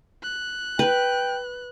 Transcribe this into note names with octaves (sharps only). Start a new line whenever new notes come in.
F#6
B4 G5